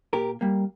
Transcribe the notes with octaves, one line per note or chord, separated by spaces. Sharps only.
A#2 G4 A#4
G3 A#3